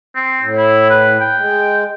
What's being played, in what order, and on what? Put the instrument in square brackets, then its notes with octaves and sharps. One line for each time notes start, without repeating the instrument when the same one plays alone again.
[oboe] C4
[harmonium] A2
[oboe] E4
B4
G5
[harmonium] G#3